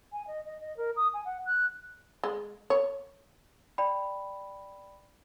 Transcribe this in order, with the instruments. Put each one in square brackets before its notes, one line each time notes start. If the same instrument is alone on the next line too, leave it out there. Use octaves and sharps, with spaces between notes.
[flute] G#5
D#5
D#5
D#5
A#4
D#6
G#5
F#5
F#6
[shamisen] G#3
C#5
[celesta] D5 G5 B5